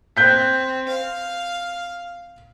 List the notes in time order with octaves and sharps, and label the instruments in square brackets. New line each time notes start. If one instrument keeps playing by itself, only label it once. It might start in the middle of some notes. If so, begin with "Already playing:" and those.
[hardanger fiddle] C4 [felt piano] F#6 G6 B6
[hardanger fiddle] F5